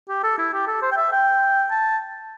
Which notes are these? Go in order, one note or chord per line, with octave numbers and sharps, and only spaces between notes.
G4
A4
E4
G4
A4
C5
G5
E5
G5
A5